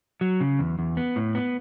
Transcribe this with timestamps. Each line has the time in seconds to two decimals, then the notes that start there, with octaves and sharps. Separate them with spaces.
0.21 F#3
0.41 C#3
0.59 E2
0.79 E2
0.97 B3
1.16 A2
1.35 B3